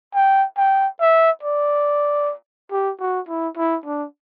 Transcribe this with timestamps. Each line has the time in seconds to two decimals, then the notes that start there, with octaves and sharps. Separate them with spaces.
0.15 G5
0.57 G5
1.00 E5
1.43 D5
2.71 G4
3.00 F#4
3.28 E4
3.57 E4
3.85 D4